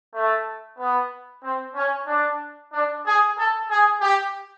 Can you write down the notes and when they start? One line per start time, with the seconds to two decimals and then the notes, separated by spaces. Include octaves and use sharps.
0.13 A3
0.77 B3
1.43 C4
1.75 C#4
2.06 D4
2.72 D4
3.04 G#4
3.37 A4
3.69 G#4
4.01 G4